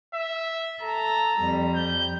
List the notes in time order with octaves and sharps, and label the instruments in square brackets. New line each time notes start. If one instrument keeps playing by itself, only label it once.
[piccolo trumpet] E5
[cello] A4 [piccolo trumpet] A#5
[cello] F2 G3
[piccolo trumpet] G6